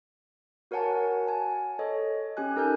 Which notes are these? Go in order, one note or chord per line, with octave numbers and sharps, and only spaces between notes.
F#4 A#4 C#5 F#5 G#5 A5
G#5 A5
A4 C#5 D#5
C#4 G4 G#5 F#6
D#4 A4 A#4 G#5 F6 G6